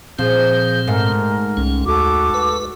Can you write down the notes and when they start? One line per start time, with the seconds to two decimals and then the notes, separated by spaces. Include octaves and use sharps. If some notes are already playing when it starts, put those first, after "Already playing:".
0.19 A#2 F3 C4 G#4 G6
0.87 G#2 A3 A#4
1.57 C2 C#4
1.86 D#2 F#4 A4 D6
2.34 B4